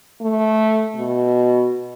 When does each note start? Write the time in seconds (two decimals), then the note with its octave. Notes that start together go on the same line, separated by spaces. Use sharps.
0.21 A3
0.96 B2